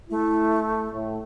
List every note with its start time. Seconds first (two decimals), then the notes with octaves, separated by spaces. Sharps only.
0.10 A3 E4
0.93 A2